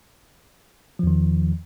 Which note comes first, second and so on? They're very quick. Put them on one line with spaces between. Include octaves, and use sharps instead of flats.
F3 E2 D#3